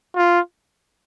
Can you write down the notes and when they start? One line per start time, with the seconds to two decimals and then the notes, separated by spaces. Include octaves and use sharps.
0.16 F4